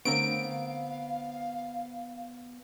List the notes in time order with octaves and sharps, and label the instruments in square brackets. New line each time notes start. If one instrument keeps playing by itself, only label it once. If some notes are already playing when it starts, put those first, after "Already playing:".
[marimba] D3 A3 D4 [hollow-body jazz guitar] B3 C4 A#4 [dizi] F5 [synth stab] D7